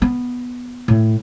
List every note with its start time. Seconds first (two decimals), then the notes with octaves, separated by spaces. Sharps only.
0.02 B3
0.88 A2